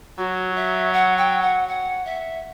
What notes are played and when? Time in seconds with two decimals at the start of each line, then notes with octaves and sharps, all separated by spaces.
0.18 F#3 F#4
0.56 E5
0.93 F#5
1.18 G5
1.42 F#5
1.68 F#5
2.05 E5